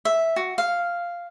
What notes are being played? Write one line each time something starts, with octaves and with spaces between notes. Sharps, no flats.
E5
F#4
F5